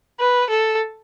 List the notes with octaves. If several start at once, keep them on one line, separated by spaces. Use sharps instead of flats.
B4
A4